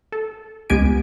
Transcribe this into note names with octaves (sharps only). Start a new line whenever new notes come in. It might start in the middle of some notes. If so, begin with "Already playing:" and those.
A4
C#2 G#3 B3 G4 G#5 D7